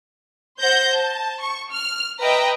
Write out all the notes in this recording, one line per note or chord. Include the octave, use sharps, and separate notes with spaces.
C5 F#5 G6 A#6
A5
C#6
F6
B4 D#5 E5 G5 A#5 B5